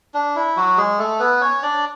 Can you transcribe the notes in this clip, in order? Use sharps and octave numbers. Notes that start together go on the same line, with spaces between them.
D4
E4
F#3 F#4
G#3 G#4
A3 A4
B3 B4
C#4 C#5
D4 D5